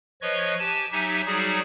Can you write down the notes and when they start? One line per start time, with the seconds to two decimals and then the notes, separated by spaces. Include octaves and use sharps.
0.22 F3 B4 C#5 D#5 C#6
0.59 G4 G#5 A5
0.92 F#3 D#4 G4 E5 G#5
1.27 F#3 G3 D#4 F#4 G#4